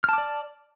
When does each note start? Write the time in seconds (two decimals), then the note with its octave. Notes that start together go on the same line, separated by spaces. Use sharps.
0.04 F6
0.09 A5
0.13 D6
0.18 D5